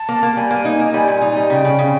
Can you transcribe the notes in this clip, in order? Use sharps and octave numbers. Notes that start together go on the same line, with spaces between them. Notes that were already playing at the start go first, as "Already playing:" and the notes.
Already playing: A5
A#3
A#3
G3 G#5
A#3
D#4
A#3
G3
A#2
D#4
G3
C#3 G5
C#3
C#3